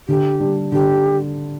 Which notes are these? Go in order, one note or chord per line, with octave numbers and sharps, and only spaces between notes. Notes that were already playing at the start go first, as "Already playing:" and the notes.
D3 G4
G3 D4
D3 G4